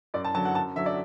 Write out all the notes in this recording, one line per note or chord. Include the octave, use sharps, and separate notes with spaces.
F#2 D5
A5
D3 F#3 A5
F#5
F#2 A5
D3 F#3 E5
D5